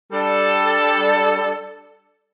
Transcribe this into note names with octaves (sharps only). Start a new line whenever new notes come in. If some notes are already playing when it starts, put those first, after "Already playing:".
G3 D4 A4